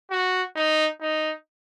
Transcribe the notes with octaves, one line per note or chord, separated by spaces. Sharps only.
F#4
D#4
D#4